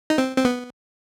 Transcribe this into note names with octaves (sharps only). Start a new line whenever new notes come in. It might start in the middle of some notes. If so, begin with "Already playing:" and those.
D#4
C4
C4
B3